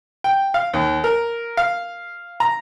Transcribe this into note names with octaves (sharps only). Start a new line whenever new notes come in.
G5
F5
D#2
A#4
F5
A#5